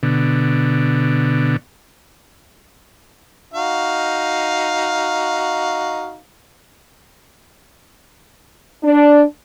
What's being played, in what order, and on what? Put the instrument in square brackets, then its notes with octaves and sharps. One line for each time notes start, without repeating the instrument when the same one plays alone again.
[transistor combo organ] B2 D3
[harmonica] D#4 F#4 F5
[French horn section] D4